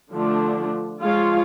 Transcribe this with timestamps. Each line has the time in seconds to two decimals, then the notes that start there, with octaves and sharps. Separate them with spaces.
0.12 D3 F3 A3 D4
1.01 F3 G#3 F4 C#5 F5